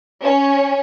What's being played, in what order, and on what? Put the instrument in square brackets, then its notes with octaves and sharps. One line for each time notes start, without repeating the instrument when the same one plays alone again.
[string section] C#4